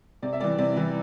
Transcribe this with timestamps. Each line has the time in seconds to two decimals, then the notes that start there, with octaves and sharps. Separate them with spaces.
0.22 C3 D5
0.33 E5
0.40 E3 G3 D5
0.58 C3 D5
0.76 E3 G3